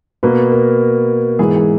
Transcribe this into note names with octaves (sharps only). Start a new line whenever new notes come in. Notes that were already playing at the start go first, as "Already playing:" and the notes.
B2 A#3 B4
A#4
G#2 E3 B3 G#4
G#4